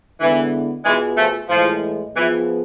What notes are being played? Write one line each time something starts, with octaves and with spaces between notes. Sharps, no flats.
D3 E3 G#3 B3 E4
B2 E3 G#3 B3 F4 G#4
F3 A3
A2 E3 F3 G#3
E3 F3 B3 F4 G#4